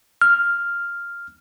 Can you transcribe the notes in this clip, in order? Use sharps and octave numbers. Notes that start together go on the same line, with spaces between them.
F6